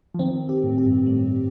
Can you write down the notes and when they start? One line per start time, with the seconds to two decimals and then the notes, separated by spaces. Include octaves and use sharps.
0.15 F3
0.19 D#3 C4
0.49 G4
0.64 A2
0.78 G4
0.85 G2
1.06 A2 G3